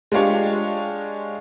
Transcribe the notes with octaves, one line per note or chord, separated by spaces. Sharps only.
G#3 D4 F4 G4 C#5